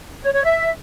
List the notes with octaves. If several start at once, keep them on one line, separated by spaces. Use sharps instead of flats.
C#5
C#5
E5